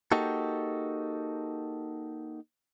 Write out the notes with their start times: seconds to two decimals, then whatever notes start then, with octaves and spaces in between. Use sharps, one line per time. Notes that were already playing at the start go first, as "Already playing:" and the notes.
0.12 A#3 D#4 F#4 G4 A4